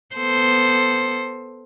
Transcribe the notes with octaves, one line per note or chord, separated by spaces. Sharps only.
B3 A4 C5